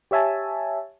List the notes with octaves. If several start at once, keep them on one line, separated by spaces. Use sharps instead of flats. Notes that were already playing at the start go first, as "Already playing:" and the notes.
G4 C#5 E5 G#5 A5